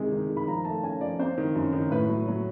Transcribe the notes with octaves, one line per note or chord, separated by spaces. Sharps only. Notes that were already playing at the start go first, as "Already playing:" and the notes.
Already playing: C3 D#3 G#3
D#3
D#3
B5
F3 A#5
A3 A5
C#4 G#5
F3 D5
C4 C5
D#3
F#2
D#3
A2 B4
F#3
F#3